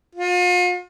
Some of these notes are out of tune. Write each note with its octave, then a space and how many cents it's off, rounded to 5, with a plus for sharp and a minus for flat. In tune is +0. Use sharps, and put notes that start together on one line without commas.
F4 +40